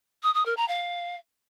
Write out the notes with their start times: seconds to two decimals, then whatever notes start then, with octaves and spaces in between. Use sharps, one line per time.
0.23 D#6
0.34 D#6
0.45 A#4
0.57 A#5
0.68 F5